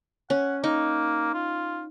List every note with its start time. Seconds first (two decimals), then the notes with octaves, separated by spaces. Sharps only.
0.30 C#4 F#5
0.64 A#3 D#4
1.34 F4